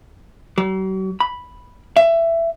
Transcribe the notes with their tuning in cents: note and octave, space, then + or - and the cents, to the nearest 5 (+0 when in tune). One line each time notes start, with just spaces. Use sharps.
F#3 +45
B5 -5
E5 +15